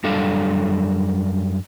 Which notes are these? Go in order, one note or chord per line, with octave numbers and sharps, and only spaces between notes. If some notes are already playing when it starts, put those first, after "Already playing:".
F#2 G3 D4 A4 F5